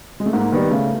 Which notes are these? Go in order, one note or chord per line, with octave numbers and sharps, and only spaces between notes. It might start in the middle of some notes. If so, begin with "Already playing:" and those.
G#3
A3
G#2 A#3
D#3 G3 B3
C#3 A3